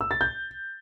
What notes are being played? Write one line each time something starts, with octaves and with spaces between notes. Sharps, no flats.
E6
A6
G6